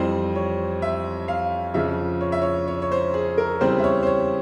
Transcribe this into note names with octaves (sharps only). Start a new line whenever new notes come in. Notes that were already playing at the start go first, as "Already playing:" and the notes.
Already playing: F2 E3 G3 C4 C5
C#5
E5
F5
F2 C#3 F3 E5
C#5
E5
C#5
C#5
C#5
C5
G#4
A#4
E2 C#3 G3 C4 C5
E5
C#5
C5
C#5